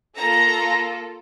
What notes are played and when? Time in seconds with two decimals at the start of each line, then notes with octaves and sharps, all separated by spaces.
0.16 A#3 F4 A4 A#5